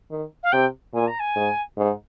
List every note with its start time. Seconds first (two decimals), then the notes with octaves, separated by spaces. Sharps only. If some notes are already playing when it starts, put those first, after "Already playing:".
0.11 D#3
0.43 F5
0.52 C3 G5
0.94 A#2 G#5
1.07 A#5
1.19 G#5
1.36 G#2
1.77 G#2